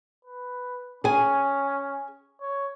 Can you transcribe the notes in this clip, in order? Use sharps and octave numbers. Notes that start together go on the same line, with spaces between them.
B4
C#4 G#4 G#5
C#5